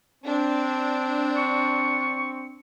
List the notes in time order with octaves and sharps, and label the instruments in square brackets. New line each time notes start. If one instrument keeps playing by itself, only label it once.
[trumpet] C4 [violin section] D4
[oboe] C#6